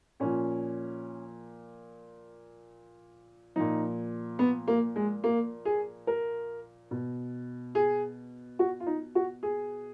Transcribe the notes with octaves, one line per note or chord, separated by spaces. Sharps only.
A#2 F3 C#4
A#2 F3 D#4
B3
A#3
G#3
A#3
G#4
A#4
B2
G#4
F#4
F4
D#4
F#4
G#4